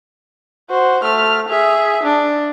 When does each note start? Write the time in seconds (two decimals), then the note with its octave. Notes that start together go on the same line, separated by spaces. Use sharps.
0.70 F#4 C5
1.03 A3 F6
1.49 G#4 E5
2.03 D4